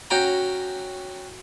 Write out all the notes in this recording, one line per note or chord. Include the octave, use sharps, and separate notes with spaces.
C#4 F#4 G5 A#5